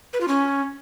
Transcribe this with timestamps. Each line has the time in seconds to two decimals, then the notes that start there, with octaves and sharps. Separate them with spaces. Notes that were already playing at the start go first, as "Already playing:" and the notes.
0.13 B4
0.21 F4
0.28 C#4